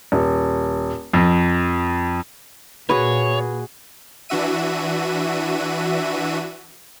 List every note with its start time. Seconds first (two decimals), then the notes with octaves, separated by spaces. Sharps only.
0.12 D#1
1.13 F2
2.90 A#2 F#4 G#4 B4 C#5
4.29 E3 D4 F#4 E5 D#7